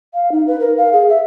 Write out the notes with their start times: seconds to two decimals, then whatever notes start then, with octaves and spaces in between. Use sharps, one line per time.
0.14 F5
0.32 D#4
0.47 B4
0.60 A#4
0.78 F5
0.93 G#4
1.09 E5